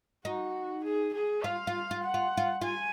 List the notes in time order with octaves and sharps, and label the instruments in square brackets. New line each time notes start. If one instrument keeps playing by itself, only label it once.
[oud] D#4 [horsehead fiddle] F#4
[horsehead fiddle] G#4
G#4
[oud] F4 [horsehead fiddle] F5
[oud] F4
F4
[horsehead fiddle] F#5
[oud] F4
F4
[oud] F4 [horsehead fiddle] G#5